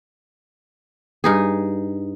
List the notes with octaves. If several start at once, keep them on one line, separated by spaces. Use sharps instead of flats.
G2 D#4 G#4